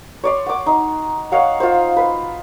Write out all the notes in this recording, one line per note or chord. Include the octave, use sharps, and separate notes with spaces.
C#5 D5 C6
F#5 D6
D#4
C#5 D#5 F5 F#5
F4 C5
B4